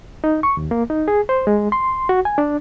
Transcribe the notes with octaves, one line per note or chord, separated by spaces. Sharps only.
D#4
C#6
D#2
A#3
D#4
G#4
C5
G#3
C6
F#4
G#5
D4